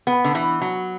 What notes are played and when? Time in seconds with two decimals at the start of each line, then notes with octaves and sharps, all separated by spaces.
0.07 B3
0.25 D3
0.35 E3
0.61 F#3